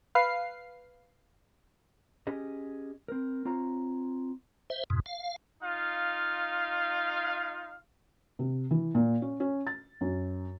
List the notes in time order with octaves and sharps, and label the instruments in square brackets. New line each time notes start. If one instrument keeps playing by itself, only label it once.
[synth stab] B4 F5 C7
[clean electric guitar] C#4 G4 G#4 D#5
C4 A#4
C4 F4 C#5 A#5
[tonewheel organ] C5 E5
F2 G#2 B2
F5
[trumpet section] D#4 F4 F5
[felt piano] C3
E3
A#2
C#4
C#4
A6
F#2